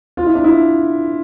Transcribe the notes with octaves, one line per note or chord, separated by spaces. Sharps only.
F4
E4
D4
E4